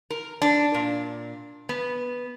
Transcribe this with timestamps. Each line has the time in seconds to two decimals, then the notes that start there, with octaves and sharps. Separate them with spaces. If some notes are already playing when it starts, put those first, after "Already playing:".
0.10 A#4
0.42 D4
0.74 A#2
1.69 B3